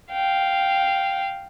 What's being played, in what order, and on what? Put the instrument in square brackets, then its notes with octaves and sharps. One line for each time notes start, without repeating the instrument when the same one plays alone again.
[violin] F5 G5